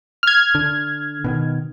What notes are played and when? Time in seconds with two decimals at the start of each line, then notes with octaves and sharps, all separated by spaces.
0.23 F6 G#6
0.55 D3
1.24 B2 D3 D#3